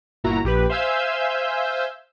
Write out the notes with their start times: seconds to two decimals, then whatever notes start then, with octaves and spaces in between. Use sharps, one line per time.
0.24 G1 A#2 E4 F#4 A#5
0.44 A#1 G4 B4
0.69 C5 E5 F5 G#5 E6 G6